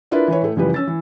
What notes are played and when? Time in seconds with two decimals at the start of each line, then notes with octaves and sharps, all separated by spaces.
0.11 D4 E4 F4 A#4 B4
0.28 E3 E4 B4 C#5
0.42 A2 A3
0.56 F#1 E3 F3 G3 B4
0.74 C#4 E6 A6
0.87 E3